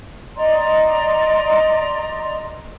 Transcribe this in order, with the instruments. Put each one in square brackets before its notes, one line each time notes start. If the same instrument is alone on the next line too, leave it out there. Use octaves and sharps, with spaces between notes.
[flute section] D5 D#5 A#5 C6